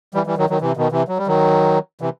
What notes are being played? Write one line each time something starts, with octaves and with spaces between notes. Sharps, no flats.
E3 G3
E3 G3
D#3 F#3
D#3 F#3
C3 E3
B2 D#3
C3 E3
F#3
G3
D#3 F#3
C3 E3